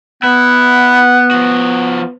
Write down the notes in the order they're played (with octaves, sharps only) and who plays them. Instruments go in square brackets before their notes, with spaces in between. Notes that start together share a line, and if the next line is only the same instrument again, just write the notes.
[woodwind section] B3 [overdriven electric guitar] E4 [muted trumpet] F#5
[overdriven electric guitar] F3 F#4